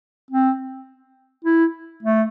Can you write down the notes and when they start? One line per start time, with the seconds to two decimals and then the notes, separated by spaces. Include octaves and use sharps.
0.31 C4
1.45 E4
2.03 A3